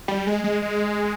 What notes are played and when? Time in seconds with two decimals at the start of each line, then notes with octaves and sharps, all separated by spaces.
0.08 G3
0.27 G#3
0.44 G#3
0.62 G#3